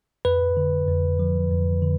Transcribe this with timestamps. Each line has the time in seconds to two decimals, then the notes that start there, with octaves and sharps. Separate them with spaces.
0.25 F2 B4
0.57 D3
0.88 F2
1.19 F3
1.51 F2
1.82 D3